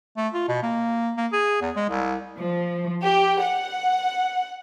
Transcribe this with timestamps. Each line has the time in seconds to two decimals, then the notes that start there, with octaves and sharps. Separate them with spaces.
0.17 A3
0.34 F4
0.48 B2
0.63 A#3
1.17 A#3
1.33 G#4
1.61 E2
1.76 G#3
1.89 C2
2.39 F3
3.02 G4
3.42 F#5